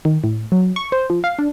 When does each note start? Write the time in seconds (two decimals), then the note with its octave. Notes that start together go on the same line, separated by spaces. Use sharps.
0.05 D#3
0.24 A2
0.52 F#3
0.76 C#6
0.92 C5
1.10 F3
1.24 F5
1.39 D4